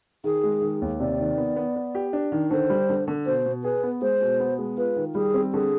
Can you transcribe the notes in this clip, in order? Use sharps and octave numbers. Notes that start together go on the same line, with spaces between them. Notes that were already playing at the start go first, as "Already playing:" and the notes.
D#3 G#4
G#3
D#3
D#2
C3 D5
D#3
B3
B3
B3
G4
D4
D#3
D3 C5
G3
D3
D3
B2 C5
B2
G#4 B4
B3
G#3 C5
B2
B3
G#3
F4 B4
D#3
G3 G#4
C4
D3 G#4